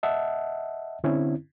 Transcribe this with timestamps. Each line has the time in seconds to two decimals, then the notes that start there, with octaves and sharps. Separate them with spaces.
0.03 D#5 E5 F#5 A5
1.04 D3 C4 C#4 E4